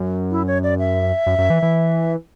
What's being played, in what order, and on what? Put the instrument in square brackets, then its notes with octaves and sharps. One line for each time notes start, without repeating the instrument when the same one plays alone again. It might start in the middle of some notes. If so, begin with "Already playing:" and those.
Already playing: [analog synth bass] F#2
[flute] E4
C#5
D5
E5
[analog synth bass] F#2
F#2
E3
E3